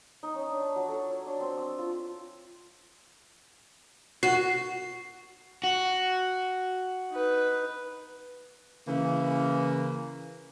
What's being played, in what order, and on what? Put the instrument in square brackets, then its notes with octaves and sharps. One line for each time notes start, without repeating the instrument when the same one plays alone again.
[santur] D#4
C#4
D4
A5
F#3
A4
C#5
D4
C4
E6
F4
[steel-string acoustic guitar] F#4 [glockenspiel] C7
[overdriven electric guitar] F#4
[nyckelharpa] D#4 B4
[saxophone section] C#3 E3 A#3